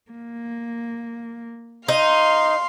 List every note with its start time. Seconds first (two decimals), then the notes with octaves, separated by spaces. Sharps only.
0.11 A#3
1.88 D#4 F5 C6